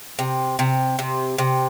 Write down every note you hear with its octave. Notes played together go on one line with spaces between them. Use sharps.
C3
C3
C3
C3